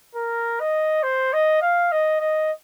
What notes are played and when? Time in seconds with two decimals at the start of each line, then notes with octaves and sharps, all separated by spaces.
0.15 A#4
0.60 D#5
1.03 C5
1.33 D#5
1.62 F5
1.92 D#5
2.21 D#5